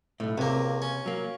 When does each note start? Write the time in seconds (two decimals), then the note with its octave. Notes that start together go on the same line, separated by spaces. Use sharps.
0.20 B1 A2
0.38 C#2 C3 A#3
0.82 C#4
1.06 F#3 A#3